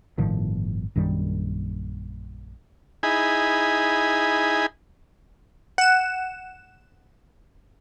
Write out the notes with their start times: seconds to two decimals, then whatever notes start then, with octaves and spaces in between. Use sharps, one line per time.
0.18 G1 A2 D#3 F3
0.96 A#1 F#2 D#3 G3
3.03 D#4 E4 G#4 G#5 B5
5.78 F#5 E7